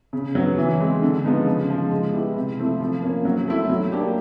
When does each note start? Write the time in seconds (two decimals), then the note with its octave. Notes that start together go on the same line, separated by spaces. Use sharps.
0.13 C#3
0.35 F#3 B3
0.58 E3
0.80 G#3 C4
1.02 D3
1.24 F3 G#3 B3 D#4
1.46 C#3
1.69 F3 G#3
1.92 G#3
2.13 B3 E4 G4
2.36 C3
2.59 F3 A3 C4 E4
2.80 F3
3.02 A#3 C#4
3.25 F#3
3.47 A3 C4 E4
3.70 F#3
3.92 A#3 D4 G4